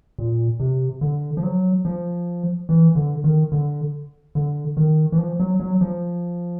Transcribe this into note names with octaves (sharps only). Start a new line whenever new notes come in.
A#2
C3
D3
F3
F#3
F3
E3
D3
D#3
D3
D3
D#3
E3
F3
F#3
F#3
F3